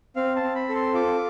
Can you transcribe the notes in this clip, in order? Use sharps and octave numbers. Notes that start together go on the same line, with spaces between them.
C4 F5
A5
C4
B5
A4
C6
F4 D6